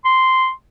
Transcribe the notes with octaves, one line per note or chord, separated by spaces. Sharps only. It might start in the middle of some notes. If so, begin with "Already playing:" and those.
C6